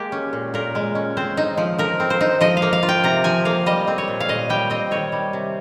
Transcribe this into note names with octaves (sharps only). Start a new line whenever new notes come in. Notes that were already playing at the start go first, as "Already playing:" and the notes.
Already playing: G#3 A#3 G4
C#4
A#2
A#2 A#4
G#3
C#4
C4 C5
D#4
F3
F3 A#4
C4
C5
D#4
F3 D#5
F5
A#3
F5
F4
G5
C3 A#5
F3 G#5
A#3 F5
G3 D#5
C4
C#5
A#2
F5
A#2 D#5
G3 G5
C4 D#5
D#3 C#5
G3
C3